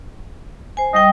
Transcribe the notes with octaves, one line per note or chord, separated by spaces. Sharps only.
C5 G#5
G3 D#5 G5